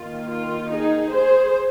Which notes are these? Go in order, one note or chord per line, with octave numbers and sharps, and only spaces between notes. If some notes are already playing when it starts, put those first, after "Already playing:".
Already playing: D#3 A#3 F4
F4
D#4 G#4
G#4 C5